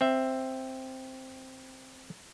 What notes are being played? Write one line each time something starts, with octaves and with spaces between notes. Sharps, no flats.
C4 E5